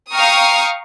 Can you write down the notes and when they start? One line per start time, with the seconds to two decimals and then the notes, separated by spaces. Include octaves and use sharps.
0.14 F5 G5 A#5 C#6 D#6 F6